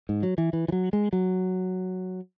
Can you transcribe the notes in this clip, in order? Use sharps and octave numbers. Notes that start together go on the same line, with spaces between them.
G#2
F#3
E3
E3
E3
F#3
G#3
F#3